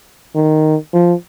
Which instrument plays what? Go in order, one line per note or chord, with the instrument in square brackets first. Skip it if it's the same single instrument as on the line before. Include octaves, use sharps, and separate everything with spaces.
[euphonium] D#3
F3